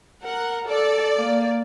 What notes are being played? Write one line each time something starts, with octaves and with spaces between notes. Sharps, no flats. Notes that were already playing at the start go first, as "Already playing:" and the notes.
A#4 F#5
A4 D5
A#3